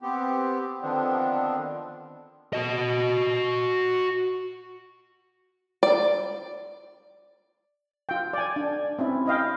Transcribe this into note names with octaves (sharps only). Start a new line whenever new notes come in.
B3 C4 G4
D3 D#3 F3 B3 C4 D4
F#4 D#5
D5
F4 G5
D5 G#5
D4
C4 C#4 E4
E4 D#5 F5 G5